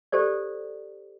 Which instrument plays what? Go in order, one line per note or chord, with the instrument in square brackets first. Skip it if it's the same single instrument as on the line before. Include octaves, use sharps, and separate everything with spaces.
[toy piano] G4 A4 C5 D5